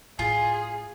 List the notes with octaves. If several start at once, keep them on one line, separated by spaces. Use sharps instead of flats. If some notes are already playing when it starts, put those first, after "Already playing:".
A2 F4 G#4 G#5